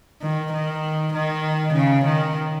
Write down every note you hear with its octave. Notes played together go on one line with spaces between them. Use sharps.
D#3
D#3
D#3
C#3
D#3